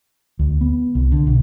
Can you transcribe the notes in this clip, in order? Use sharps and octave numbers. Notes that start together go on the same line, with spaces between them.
D2
B3
C2
D3
B1